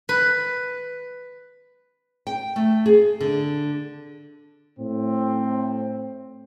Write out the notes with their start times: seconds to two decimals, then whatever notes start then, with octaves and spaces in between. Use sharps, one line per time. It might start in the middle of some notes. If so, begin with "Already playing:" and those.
0.09 B4
2.27 G5
2.56 A3
2.86 G#4
3.21 D3
4.79 A2 C4